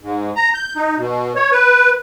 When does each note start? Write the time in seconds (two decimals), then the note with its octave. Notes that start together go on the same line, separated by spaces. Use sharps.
0.01 G#2
0.36 A#5
0.54 G6
0.76 D#4
0.98 B2
1.36 C#5
1.52 B4